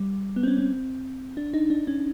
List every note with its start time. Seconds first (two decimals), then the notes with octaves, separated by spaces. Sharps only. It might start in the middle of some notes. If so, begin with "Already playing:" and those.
Already playing: G3
0.36 B3
0.43 C4
0.47 C#4
0.58 C4
1.37 D4
1.54 D#4
1.70 D4
1.87 C#4